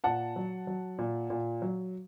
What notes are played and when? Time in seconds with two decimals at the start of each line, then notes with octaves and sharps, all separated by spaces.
0.04 A#2 F#5 A5
0.36 F#3
0.67 F#3
0.99 A#2
1.30 A#2
1.62 F#3